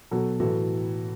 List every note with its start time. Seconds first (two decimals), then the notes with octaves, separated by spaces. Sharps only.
0.11 B2 F#3 F#4 A4
0.40 A2 E3 F#4 A4